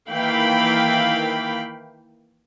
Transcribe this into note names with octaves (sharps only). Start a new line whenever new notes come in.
D#3 E3 A#3 F5 G5 B5